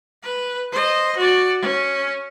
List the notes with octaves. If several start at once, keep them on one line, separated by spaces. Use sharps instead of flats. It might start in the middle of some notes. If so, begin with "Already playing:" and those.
B4
C5 D#5
F#4 D5
C#4